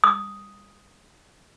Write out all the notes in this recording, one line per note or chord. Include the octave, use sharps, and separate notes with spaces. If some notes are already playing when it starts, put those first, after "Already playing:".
D#6